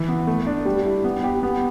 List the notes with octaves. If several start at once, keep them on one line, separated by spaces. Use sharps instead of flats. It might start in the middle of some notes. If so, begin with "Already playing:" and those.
Already playing: E3
B3
A3
D4
G3
E4
B3
G4
B3